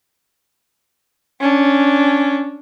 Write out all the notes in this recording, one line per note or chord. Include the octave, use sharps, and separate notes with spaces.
C#4 D4